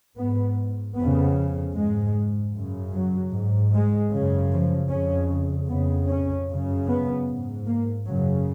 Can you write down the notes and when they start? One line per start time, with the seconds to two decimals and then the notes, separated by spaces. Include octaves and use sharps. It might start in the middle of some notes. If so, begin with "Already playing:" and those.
0.17 G#2 B3
0.96 F2 C#3 B3
1.75 G#2 G#3
2.54 F#2 C#3
2.93 F#3
3.32 G#2
3.72 G#3
4.11 F#2 C#3
4.51 F3
4.90 F2 C#3 C#4
5.69 F2 C#3 B3
6.09 C#4
6.48 F#2 C#3
6.87 B3
7.27 G#2
7.66 A#3
8.06 F#2 C#3 F#3